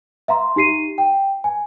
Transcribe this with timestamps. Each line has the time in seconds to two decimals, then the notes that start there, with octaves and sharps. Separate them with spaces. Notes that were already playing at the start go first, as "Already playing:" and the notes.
0.28 E5 F5 A#5 C6
0.56 D#4 G4 C7 D#7
0.98 G5
1.44 G#5